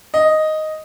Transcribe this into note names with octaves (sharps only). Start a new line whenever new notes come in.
D#5